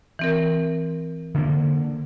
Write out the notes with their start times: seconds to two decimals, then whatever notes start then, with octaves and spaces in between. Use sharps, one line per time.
0.19 E3 C4 A#4
1.35 D3 A#3